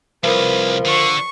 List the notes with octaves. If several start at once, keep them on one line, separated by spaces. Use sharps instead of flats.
C2 F3 A#4 B4
D3 C#6